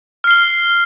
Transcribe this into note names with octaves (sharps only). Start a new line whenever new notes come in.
F6 C7 G7